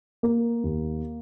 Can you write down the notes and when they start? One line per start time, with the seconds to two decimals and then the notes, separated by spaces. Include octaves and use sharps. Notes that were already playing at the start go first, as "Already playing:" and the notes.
0.23 A#3
0.63 D#2